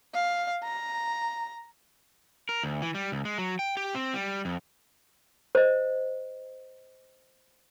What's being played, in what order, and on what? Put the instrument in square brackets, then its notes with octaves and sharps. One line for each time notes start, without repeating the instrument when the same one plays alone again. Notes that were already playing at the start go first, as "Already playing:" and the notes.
[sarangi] F5
A#5
[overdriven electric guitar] A#4
D2
E3
G3
C#2
G#3
F#3
G5
G4
C4
G3
F2
[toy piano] C5 D#5